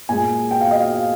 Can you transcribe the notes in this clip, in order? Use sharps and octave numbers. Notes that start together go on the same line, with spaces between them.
A#2 G#3 G#5
G5
F5
D#5
F5